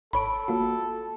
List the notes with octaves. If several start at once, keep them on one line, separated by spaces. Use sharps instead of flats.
G#1 A4 C#5 B5 D7
A#3 F4 F#4